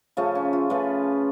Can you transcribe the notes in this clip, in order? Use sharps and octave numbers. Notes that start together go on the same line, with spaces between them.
C#3 F3 A3 C#4
C#4
F4
C#3 F3 A3 B4